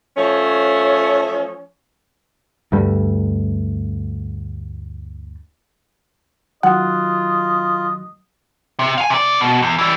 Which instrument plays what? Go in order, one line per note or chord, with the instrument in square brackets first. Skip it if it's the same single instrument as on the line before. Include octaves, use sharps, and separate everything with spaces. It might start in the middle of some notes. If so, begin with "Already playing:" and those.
[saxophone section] F3 A3 C#4 C#5
[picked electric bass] D2 G2 G3 A3
[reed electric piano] D#3 F#3 F#6 [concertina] F4 [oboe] D#5 [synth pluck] F#5
[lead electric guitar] C3
F5 G#5
C3 D5
B2
E2
E3 G3